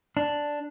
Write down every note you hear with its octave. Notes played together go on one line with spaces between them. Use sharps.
D4